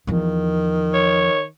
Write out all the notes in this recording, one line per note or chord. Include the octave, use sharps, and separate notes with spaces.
E2 D#3 F3
C#5